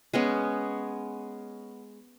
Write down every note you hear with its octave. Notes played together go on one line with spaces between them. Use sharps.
G#3 B3 C#4